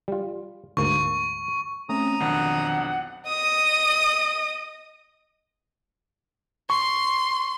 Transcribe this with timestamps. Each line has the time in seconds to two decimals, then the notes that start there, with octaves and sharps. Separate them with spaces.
0.08 G3 F4
0.77 D2 G#2 A#3 C#6
1.89 A3 C4 C#4 A#5 D#6
2.20 B1 F2 D#3 D4 F#5
3.28 D#5 D#6
6.70 C6 C#6